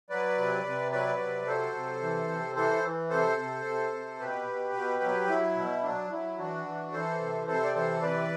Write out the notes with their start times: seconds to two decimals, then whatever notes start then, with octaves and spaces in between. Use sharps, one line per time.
0.10 F#3 B4 D5
0.38 C3
0.65 C3
0.92 F#3 B4 D5
1.19 C3
1.46 F#3 A4 C5
1.74 C3
2.01 E3
2.29 C3
2.56 E3 A4 C5
2.84 E3
3.10 C3 A4 C5
3.37 C3
3.65 C3
3.92 C3
4.19 B2 G4 B4
4.47 B2
4.74 B2
5.02 F#3
5.29 F#3 E4
5.56 B2
5.83 F#3 D4
6.11 F#3 E4
6.38 E3 D4 F#4
6.65 E3
6.92 E3 A4 C5
7.20 C3
7.47 C3 A4 C5
7.64 D5
7.74 E3 A4 C5
8.02 C3 B4 D5